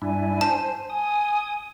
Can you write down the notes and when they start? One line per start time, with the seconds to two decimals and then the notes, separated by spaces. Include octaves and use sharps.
0.02 G2 D4 E4 G#5
0.41 C5 A5
0.90 G#5 D#6